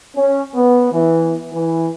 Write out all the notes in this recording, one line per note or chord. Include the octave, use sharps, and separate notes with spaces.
C#4
B3
E3
E3